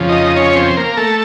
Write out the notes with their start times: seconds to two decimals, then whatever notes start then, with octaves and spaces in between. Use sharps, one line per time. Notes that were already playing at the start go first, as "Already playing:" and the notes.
Already playing: F2 C#3 F3
0.09 D#4 D#5
0.36 C#4 C#5
0.56 C4 C5
0.77 A#3 A#4
0.97 A3 A4